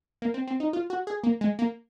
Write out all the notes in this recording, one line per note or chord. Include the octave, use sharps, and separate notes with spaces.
A#3
C4
C4
D#4
F4
F#4
G#4
A#3
G#3
A#3